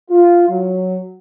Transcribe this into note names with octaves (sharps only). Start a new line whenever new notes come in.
F4
F#3